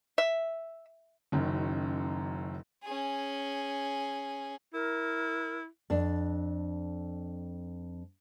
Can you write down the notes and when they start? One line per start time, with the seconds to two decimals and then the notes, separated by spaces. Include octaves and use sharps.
0.18 E5
1.32 F#1 F#2 D#3
2.83 C#4 G#4
4.74 E4 A#4
5.90 F2 D4